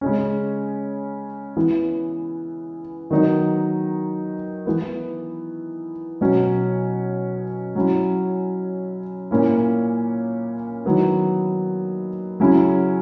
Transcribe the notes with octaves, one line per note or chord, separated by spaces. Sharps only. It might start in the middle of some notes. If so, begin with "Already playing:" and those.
C#3 G#3 C#4
E3 B3 E4
D#3 F#3 B3 D#4
E3 B3 E4
B2 F#3 C#4
F#3 C#4 E4
A#2 A#3 C#4 E4
D#3 F#3 B3 E4
C#3 F#3 C#4 E4